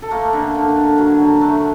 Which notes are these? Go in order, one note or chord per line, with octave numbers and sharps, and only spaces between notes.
A4
A3 A#3 A#4
D3
D3
D3
F#3
D3
D3 A3 A4